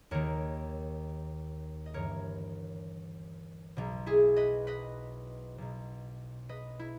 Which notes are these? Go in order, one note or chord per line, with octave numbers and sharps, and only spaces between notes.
D#2 D#3 A#4 C#5
D#5
G1 G2 E3 A#4 C#5
B1 B2
E4 G#4
B4 D#5
B4 D#5
B1 B2
B4 D#5
E4